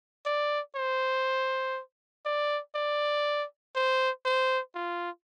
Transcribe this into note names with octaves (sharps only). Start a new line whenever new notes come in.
D5
C5
D5
D5
C5
C5
F4